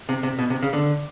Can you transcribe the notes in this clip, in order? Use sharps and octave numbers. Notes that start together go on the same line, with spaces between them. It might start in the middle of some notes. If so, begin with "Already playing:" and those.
C3
C3
B2
C3
C#3
D3